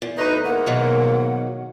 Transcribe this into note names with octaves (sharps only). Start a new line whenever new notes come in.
E2
D2 D#4 B4
G#2 A#3 F#5
B2 D#3 F#3